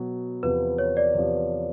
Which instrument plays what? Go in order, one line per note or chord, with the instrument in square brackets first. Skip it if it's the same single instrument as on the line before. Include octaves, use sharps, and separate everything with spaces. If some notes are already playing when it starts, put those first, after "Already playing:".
Already playing: [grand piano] B2 F#3 B3
[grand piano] E2 C3 F3 [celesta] B4
[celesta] C#5
D5
[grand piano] E2 C3 F3